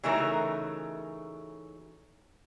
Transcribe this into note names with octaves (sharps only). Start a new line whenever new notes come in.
C#3 E3 F#3 A3 D#4 A#4